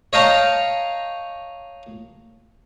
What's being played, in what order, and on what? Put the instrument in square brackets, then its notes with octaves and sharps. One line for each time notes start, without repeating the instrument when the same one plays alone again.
[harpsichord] C#5 D#5 F5 G5 A5 A#5